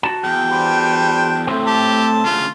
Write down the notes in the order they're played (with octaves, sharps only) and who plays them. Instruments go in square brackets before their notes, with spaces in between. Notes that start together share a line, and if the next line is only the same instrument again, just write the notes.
[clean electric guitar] F#4 A5
[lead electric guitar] E2 [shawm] G5
[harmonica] G3 D4 C5
[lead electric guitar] A2 [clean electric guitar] A3 C4
[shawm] G4 [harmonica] A5
[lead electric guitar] D2 C#3 [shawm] F4